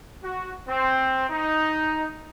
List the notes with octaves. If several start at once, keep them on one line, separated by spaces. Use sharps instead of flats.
F#4
C4
D#4